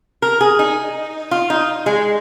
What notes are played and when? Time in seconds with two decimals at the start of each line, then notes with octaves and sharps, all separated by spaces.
0.22 A#4
0.41 G#4
0.59 D#4
1.31 F4
1.50 D#4
1.86 G#3